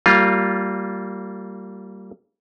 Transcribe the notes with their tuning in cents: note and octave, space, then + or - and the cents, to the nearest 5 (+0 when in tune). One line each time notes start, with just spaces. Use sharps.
G3 -20 A#3 -30 F4 +0